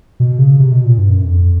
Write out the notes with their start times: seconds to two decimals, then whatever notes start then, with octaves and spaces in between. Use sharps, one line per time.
0.20 B2
0.39 C#3
0.59 C3
0.71 B2
0.84 A#2
0.98 G2
1.10 F#2
1.24 F2